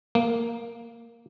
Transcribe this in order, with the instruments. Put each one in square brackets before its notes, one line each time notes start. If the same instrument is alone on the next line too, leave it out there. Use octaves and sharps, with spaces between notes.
[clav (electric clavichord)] A#3